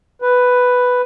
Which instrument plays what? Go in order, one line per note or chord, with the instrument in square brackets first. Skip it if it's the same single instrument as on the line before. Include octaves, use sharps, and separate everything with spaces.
[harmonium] B4